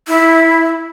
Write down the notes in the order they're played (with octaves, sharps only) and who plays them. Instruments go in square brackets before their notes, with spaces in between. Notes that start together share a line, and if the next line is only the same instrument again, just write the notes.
[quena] E4